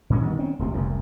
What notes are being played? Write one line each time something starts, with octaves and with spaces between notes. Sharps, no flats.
A#2 D3 G#3 C#4
D#3 G3 B3
C4 C#4
D#1 D2 C3
F1 C2 F#2